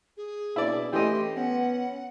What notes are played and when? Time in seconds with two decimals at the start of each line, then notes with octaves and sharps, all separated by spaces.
0.17 G#4
0.56 B2 C#4 D4 E4 D5
0.93 E3 A3 C#4 G4 D#5 C6
1.36 B3 C#4 F#5